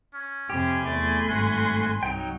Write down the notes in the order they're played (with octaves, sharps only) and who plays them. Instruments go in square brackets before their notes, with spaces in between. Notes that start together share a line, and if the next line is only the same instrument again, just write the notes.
[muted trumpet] C#4
[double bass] F2 C3 [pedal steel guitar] G4 [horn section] G#5 B5 C6
[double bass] E2 [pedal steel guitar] A3 [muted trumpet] D5
[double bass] G#1 G2 [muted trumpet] F#4
[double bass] C2 [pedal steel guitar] F#3 D#4 G5